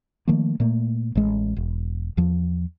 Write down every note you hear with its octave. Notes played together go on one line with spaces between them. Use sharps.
D#3 F3 A3 A#3
A#2 A3 A#3
A1 G#3
E1
E2 F3